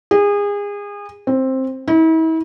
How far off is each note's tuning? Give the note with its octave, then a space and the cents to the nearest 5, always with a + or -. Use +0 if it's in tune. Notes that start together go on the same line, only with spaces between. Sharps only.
G#4 -30
C4 +10
E4 -40